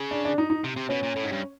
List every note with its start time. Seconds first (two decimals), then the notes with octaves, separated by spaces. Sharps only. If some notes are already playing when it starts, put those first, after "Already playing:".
Already playing: C#3
0.11 D4
0.25 D4
0.38 D#4
0.50 D#4
0.64 C3
0.76 C3
0.89 B2 C#4
1.03 A#2
1.16 A2
1.25 G#2
1.32 G2